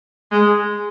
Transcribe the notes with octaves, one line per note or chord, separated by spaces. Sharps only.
G#3